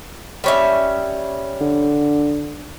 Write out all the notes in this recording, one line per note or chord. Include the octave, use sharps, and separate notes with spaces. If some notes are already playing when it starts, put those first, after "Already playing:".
G3 C#4 E5
D3